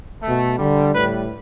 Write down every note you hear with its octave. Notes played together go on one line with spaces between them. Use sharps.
B2 A3
D3 G3
A2 G3 B4